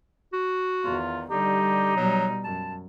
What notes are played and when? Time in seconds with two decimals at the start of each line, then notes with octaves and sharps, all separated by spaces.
0.33 F#4
0.83 E2 D#3 F4
1.31 D3 G3 D#4 G4
1.97 B2 F#3 G3
2.44 F#2 A5